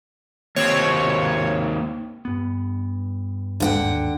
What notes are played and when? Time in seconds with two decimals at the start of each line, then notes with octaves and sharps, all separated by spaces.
0.56 D#2 C4 C#5
2.25 G2 B3
3.60 G#1 D#2 D3 F#5 G5